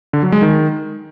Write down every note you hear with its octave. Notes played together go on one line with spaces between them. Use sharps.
D3
F#3
G#3
D#3